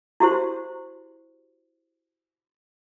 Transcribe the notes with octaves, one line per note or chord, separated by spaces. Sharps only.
E4 F#4 G4 C5